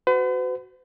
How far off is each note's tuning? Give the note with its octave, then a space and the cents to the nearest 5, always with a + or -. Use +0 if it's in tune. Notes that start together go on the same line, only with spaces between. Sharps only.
F#4 +0 B4 +45